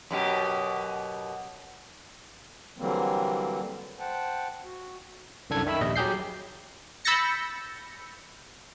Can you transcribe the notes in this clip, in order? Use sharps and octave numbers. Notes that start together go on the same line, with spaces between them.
F#2 B2 G4
D3 E3 F#3 G3 A#3 C4
C5 F#5 G5 A5
F#4
C2 F#2 D4 A4 G#6
D#3 E5 B5 E6
A#1 D#2 G3 D#5
F#3 G4 G#4 G6 C7
B5 E6 G6 A6 A#6 C#7